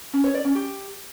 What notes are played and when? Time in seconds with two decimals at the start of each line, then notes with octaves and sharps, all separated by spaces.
0.13 C#4
0.24 C#5
0.34 D5
0.45 C#4
0.55 G4